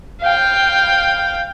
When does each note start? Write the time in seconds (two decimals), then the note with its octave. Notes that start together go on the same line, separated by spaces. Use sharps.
0.21 F5 G5